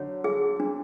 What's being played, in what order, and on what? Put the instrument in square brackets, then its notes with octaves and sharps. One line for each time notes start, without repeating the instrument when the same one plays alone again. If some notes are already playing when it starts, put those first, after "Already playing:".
Already playing: [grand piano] D3 F#3 [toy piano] C#5
[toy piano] G#4
D4